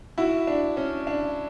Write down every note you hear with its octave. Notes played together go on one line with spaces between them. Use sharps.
E4 F#4
D4
C#4
D4